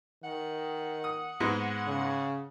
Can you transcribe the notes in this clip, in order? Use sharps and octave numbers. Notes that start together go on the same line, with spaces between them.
D#3 F#5
D#6
G#2 G#3 B3
C#3